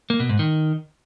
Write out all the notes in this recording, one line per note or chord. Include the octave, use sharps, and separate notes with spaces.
A#3
B2
G#2
D#3